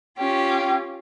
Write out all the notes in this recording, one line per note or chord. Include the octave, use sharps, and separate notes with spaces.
C#4 F4 G4